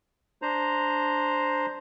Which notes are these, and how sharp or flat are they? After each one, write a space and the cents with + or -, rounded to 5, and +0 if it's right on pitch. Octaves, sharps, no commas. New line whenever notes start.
D4 +0 C5 +0 A#5 +0